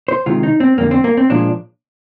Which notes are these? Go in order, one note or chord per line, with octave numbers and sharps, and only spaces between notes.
C5
C3 D#3 G#3 F4
D#4
C4
F2 D3 G3 A#3
C4
A#3
C4
A#2 F3 G#3 D4